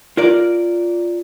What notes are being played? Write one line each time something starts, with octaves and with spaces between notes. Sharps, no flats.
F4 A#4 D5